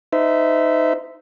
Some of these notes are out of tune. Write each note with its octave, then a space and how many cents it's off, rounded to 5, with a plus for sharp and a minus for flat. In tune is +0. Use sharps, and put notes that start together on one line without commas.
D#4 +0 C5 -35 E5 +0